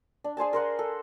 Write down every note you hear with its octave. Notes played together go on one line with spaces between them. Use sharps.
D4
G#4 C5 G#5 A5
A#4 C5 F#5
A4